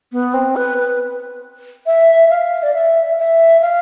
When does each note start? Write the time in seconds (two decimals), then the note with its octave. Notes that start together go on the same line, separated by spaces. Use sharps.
0.12 B3
0.34 C4
0.56 B4
0.77 B4
1.86 E5
2.30 F5
2.63 D5
2.74 E5
3.18 E5
3.62 F5